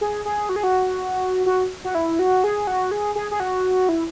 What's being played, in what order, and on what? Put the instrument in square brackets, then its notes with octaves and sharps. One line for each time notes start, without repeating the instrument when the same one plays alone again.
[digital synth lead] G#4
G#4
F#4
G#4
F#4
F#4
F#4
E4
F#4
G#4
F#4
G#4
G#4
G#4
F#4
E4